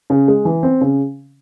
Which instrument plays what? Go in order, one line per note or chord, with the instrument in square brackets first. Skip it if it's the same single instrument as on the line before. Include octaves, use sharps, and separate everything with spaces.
[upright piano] C#3
G#3
E3
C4
C#3